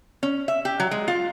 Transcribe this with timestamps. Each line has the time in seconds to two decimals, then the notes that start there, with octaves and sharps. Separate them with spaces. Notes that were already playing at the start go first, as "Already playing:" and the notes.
0.23 C#4
0.48 E5
0.65 G4
0.80 F#3
0.91 G#3
1.08 F4